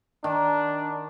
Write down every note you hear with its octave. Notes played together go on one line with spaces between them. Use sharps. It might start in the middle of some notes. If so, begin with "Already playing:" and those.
D#3 D4